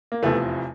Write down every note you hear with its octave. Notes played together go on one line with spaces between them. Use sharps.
A#3
F1 E2 C3 F3 A3 B3